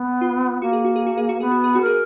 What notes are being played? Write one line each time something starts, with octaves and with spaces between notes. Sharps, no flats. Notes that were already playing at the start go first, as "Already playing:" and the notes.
Already playing: B3
F4
A#3 F#4
G#4
F#4
G#4
F#4
G#4
F#4
B3 G#4
F#4
G#4
F#4
G#4 A#4